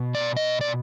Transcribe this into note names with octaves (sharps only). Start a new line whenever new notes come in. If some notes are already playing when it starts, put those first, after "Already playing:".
Already playing: B2 B3
D5
D#5
D5